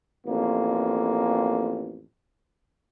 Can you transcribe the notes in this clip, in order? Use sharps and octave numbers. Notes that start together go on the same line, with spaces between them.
A1 F2 A#3